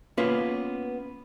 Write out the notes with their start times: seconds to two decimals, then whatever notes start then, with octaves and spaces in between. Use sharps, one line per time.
0.17 A#3 B3 C#4 F4 B4